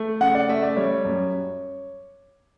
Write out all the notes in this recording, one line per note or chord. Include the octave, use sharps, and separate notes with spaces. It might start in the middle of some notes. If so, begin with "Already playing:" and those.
Already playing: A3
C#3 F#5
D5
A3 E5
D5
G3 C#5
F#2